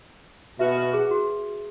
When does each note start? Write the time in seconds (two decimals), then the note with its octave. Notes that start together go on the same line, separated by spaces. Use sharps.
0.59 B2 B3 F#4 B4 E5
0.77 B4
0.93 G#4
1.11 F#4